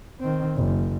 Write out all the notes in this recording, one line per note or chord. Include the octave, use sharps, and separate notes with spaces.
D#3 C4
F#1